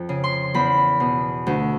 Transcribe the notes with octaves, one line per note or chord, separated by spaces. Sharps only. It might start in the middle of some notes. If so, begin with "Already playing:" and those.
Already playing: F2
C#3
C6
E2 B5
B2
D2